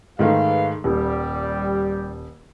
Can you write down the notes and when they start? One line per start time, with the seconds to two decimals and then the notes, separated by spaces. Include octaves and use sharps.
0.19 G#2 D#3 A3 G#4 B4 F5
0.84 D#1 G3